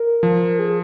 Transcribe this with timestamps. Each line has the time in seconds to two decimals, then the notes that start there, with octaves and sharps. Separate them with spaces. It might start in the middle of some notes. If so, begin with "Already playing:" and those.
Already playing: A#4
0.23 F3
0.59 G#4